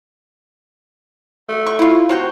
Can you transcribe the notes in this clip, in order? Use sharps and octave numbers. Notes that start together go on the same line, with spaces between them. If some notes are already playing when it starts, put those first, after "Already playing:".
A3
C#6
E4 F4
C3 F#4 C#5 G5